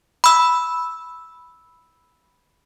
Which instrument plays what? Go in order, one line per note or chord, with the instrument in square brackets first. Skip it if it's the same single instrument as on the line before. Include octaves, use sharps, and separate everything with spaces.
[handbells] B5 E6